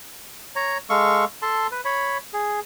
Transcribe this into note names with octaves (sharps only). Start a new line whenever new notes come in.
C#5 A#5
G#3 A4 F5 C#6
A4 A5 C6
B4
C#5 B5
G#4